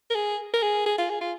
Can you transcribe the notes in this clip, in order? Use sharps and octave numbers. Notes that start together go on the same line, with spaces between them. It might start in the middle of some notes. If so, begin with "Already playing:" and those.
A#4
G#4
A#4
G#4
G#4
F4
G#4
F4